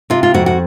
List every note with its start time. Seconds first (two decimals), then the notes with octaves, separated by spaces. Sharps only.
0.10 C3 F4
0.23 F4
0.34 F2 F#4
0.46 F#4